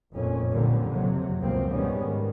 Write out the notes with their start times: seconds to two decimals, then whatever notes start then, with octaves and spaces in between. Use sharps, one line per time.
0.13 F1 F2 A#2 C#4
0.51 B1 F2 A#2 D3 G3
0.93 F#1 F2 C3 F#3
1.40 C#2 G2 B2 F3 A#3 C4
1.70 G#2 D#3 G3 G#3 B3 C#4
2.00 G#2 D#3